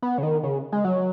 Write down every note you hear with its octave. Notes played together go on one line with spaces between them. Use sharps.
B3
C#3
D#3
C#3
G#3
F#3